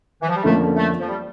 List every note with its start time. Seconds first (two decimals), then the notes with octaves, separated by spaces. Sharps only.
0.21 E3
0.28 F3
0.36 G3
0.44 F2 D3 F3 A3 A#3 C#4
0.76 A3
1.00 F3
1.09 G3